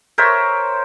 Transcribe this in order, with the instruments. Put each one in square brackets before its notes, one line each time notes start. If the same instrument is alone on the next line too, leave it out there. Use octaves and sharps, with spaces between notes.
[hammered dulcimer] A#4 C5 C#5 E5